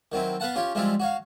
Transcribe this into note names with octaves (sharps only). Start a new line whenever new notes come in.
D#3 F#3 C4 E4
B3 B4 F5 F#5 A5
C#4 F4 G4 C#5
F3 G3 G#3 C4 E4 F4
F#4 C#5 F5